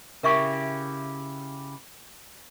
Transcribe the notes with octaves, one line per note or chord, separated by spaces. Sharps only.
C#3 E4 G4 A#4 E5 C#6